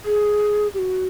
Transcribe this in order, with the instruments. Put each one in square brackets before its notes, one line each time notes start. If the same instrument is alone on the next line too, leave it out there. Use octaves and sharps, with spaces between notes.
[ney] G#4
G4
F#4